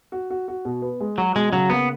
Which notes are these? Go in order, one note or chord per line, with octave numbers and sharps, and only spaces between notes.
F#4
F#4
F#4
B2
B3
G#3
F#3 F#4
B2 G#3
C#3 F#3
A#3 B3